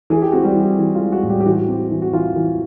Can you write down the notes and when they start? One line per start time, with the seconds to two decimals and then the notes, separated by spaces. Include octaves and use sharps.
0.10 E3 G#4
0.22 G4
0.32 C4 F#4
0.43 G3 G4
0.56 E3
0.79 E3
0.95 F4
1.00 G#3
1.12 F#4
1.23 A2
1.29 G3 G4
1.40 G4
1.46 E3 F#4
1.68 C4
1.91 E3
2.02 F#4
2.13 E3 F4
2.36 E3